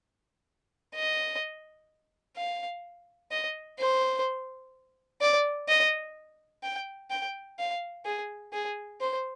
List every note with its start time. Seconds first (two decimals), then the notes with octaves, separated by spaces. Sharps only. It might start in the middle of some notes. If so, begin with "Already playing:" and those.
0.95 D#5
2.37 F5
3.31 D#5
3.79 C5
5.21 D5
5.68 D#5
6.63 G5
7.10 G5
7.59 F5
8.05 G#4
8.53 G#4
9.01 C5